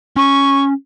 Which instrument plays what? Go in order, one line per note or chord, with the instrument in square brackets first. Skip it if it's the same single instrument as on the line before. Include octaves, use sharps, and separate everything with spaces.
[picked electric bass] C#4 [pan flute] C#6